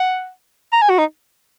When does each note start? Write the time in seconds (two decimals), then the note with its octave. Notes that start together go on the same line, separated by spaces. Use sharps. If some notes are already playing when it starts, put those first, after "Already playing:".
Already playing: F#5
0.73 A#5
0.82 G#5
0.90 F#4
0.98 D#4